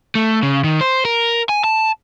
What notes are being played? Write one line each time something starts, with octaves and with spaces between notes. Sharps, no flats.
A3
C#3
D#3
C5
A#4
G#5
A5